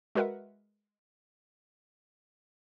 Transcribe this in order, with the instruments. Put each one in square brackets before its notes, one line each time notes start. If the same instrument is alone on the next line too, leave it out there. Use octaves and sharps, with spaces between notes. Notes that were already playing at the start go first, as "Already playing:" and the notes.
[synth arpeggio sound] G#3 F#4 A#4 B4 E5 F#5